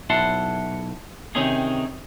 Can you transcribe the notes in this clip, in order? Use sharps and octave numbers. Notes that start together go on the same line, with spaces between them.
B1 E4 F#5 A5 C6
C3 D#3 C4 C#4 D#4 G#4